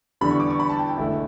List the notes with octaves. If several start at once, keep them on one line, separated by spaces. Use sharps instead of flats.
E2 D3 G3 B3 B5
C#6
D6
C#6
B5
A5
G5
G5
E1 E2 D3 A3 E4